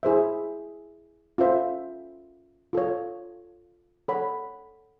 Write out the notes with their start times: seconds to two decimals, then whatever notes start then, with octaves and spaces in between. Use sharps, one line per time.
0.03 E4 G#4 C5 E5
1.38 C#4 F4 A4 C5 E5
2.73 F4 A4 C#5
4.08 A4 C#5 F#5 B5